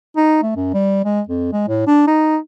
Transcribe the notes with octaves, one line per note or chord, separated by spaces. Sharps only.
D#4
A3
F#2
G3
G#3
F2
G#3
A2
D4
D#4